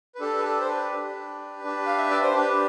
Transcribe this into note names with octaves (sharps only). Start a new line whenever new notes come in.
B4
D4 G4 A4
B4
A4
C5
B4
D4 G4
D4 G4
F5
E5
D5
C5
D4 G4 B4